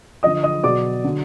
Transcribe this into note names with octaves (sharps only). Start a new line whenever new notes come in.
D3 F3 D#5 D#6
D#5 D#6
B2 F#3 D5 D6
D3 F#3